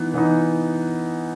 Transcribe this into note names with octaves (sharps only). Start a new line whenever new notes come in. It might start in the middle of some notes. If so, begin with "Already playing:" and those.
Already playing: E3 B3 D#4
E3 B3 D#4